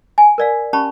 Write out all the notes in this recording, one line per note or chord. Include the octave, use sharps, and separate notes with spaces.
G#5
A#4 D5 F5
C#4 G4 A5 B5 C#6